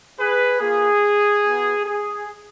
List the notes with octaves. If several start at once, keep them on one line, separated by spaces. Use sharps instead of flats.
G#4 B4
A#3 F4 G#4
B3 F#4
G#4